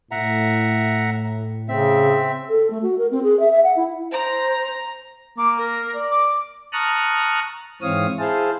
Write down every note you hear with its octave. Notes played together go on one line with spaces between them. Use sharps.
A2 E5 F#5 A#5
C#3 C4 E5
A4
A3
F#4
A#4
C4
G#4
E5
E5
F#5
E4
C5 A#5
A#3 D6
A#4
D5
D6
A5 A#5 C#6 D#6 F6 F#6
G#2 E3 C4 C#5 F5 D#6
E4 G#4 C5 F5 A5